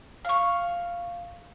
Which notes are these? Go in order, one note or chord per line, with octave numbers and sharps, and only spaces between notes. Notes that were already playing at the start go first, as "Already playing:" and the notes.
F5 C#6